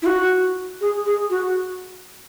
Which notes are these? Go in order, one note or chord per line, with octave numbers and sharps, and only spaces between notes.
E4
F#4
G#4
G#4
F#4